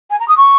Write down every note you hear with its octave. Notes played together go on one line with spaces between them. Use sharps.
G#5
A#5
D#6
C#6